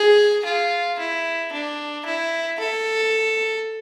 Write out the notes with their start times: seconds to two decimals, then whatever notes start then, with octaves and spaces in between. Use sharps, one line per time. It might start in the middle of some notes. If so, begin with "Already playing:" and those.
Already playing: G#4
0.44 F4
0.98 E4
1.52 D4
2.06 E4
2.60 A4